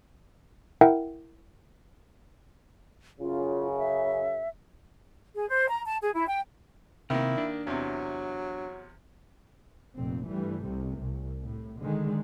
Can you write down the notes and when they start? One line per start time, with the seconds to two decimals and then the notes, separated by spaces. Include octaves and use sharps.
0.81 E4 A#4 E5 F#5 G5
3.20 F#2 C#3 F4
3.77 E5
5.34 G#4
5.49 C5
5.71 A#5
5.86 A5
6.02 G#4
6.15 E4
6.28 G5
7.10 C3 D#3 A#3 E4
7.38 D4
7.67 E2 C3 F#3
9.95 F1 F2 A#2 C4
10.26 G2 E3 G3 A3
10.64 C2 C3
10.99 C2
11.44 A2
11.81 D3 D#3 G#3